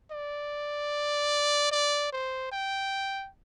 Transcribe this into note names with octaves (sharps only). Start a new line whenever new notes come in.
D5
D5
C5
G5